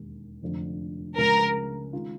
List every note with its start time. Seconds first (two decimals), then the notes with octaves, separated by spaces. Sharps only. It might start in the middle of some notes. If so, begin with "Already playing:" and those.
Already playing: E1 D#2 D#3
0.42 F1 F2 D3 F3
1.18 C#2 C#3 F3 G#3 A#4
1.93 D#3 G#3 C#4 F4